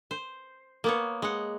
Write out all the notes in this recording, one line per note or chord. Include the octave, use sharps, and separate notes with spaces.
C5
A#3 B3 C#5
G#3 F#5